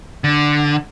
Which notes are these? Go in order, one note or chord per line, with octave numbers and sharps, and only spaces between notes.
D3